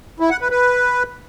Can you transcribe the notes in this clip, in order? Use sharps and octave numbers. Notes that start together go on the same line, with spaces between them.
E4
F#5
B4
B4